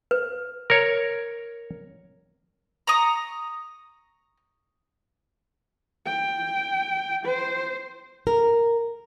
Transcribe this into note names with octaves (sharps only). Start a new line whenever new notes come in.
B4
A#4 C#5
A#5 C#6 D#6
G5
C5
A#4